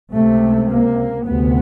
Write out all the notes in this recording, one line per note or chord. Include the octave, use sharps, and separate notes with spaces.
C#2 C3 A3
A#3
D2 C3 B3